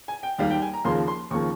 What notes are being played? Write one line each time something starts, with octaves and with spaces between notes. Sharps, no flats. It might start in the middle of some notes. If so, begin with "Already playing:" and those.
G#5
G5
D#2 D#3 G3 F5
G5
G#5
A#5
D#2 C#3 F3 A#3 C6
C6
D#2 C#3 F3 A#3 C#6